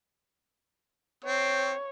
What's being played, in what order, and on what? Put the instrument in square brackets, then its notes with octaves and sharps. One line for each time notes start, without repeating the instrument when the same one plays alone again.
[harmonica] C4 [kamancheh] C#5